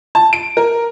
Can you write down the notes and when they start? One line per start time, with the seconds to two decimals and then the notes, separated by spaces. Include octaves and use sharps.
0.15 A5
0.33 D7
0.57 A#4